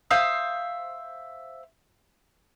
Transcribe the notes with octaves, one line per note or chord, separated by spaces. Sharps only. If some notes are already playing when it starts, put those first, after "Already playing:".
C5 E5 F5 D#6